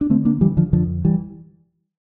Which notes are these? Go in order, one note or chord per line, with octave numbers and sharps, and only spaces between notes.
D4
D3 A3 C4
A#3 D4
D3 E3 G3
D3 F3
F2 D3 F3
E3 G3